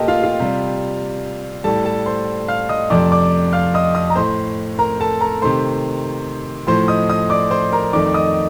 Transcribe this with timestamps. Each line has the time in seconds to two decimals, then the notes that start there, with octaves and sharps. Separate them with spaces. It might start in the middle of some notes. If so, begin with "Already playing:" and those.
Already playing: A#2 A3 G4 A4 A#4 D#5 G5 A5
0.08 F4 F5
0.23 F4 F5
0.40 C3 G3
1.64 A2 G3 A4 A5
1.85 A4 A5
2.06 C5 C6
2.48 F5 F6
2.69 D#5 D#6
2.90 F2 C3 F3 A3 D5 D6
3.11 D5 D6
3.53 F5 F6
3.74 D#5 D#6
3.95 D#5 D#6
4.10 A#5
4.16 A2 A3 C5 C6
4.78 A#4 A#5
5.00 A4 A5
5.21 A#4 A#5
5.42 C3 D#3 A3 C5 C6
6.67 A2 F3 A3 C5 C6
6.88 D#5 D#6
7.09 D#5 D#6
7.30 D5 D6
7.51 C5 C6
7.72 A#4 A#5
7.93 F2 D#3 A3 D5 D6
8.06 D6
8.14 D#5 D#6